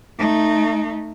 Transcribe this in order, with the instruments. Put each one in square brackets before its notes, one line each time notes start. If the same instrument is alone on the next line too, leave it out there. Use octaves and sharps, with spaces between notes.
[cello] A3 D#4